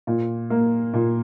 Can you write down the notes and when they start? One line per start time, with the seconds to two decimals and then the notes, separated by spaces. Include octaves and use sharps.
0.07 A#2
0.50 A#3
0.94 A#2